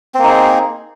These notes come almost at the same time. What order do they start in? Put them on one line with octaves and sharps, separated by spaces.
C4 A#3 D#4 G#4